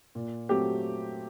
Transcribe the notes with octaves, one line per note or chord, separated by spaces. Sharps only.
A#2
F#3 A3 C4 G4